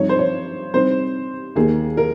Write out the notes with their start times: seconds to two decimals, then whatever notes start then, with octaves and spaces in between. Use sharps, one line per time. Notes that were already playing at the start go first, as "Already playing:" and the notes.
Already playing: G2 F3 C4 D#4 C#5
0.09 C5
0.19 C#5
0.74 C3 G3 C4 D#4 C5
1.56 D#2 D#3 A#3 D#4 G#4
1.97 A#4